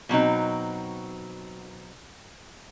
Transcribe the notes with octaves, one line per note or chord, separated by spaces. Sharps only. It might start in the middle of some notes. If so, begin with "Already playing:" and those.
B2 F#3 C4 D#4